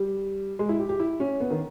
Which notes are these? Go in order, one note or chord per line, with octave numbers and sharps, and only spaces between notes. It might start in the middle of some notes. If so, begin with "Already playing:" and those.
Already playing: G3
G#3
E4
G4
G4
E4
C#4
B3
D#3